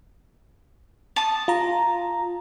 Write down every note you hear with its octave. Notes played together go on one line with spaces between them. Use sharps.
A5 D#6
F4 A#5